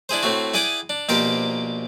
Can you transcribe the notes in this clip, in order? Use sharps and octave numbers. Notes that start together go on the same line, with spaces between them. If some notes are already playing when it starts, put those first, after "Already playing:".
D4 E4 G#4 C5
A2 A3 C4 F#4
E4 G#4 D5 F#5 G5 D#6
D4
A#1 B2 G4 A#4 C5 D5